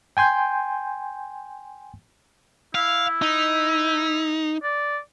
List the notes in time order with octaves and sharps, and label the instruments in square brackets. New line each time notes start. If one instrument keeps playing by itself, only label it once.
[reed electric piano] G5 G#5 C6 G6
[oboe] E4 [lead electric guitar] F5
[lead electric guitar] D#4
[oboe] D5